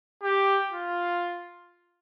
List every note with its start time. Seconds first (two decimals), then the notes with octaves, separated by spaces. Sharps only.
0.23 G4
0.71 F4